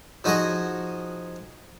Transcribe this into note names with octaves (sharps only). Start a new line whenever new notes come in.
F3 D#4 F#4 G#4 D#5